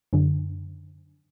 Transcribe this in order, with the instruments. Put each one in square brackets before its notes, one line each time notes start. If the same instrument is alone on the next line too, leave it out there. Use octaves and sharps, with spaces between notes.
[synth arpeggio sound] F#2 D3